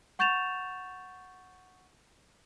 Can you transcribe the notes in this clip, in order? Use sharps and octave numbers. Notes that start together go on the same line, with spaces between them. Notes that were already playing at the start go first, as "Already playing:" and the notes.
F#5 C#6 G6 A6 E7 F7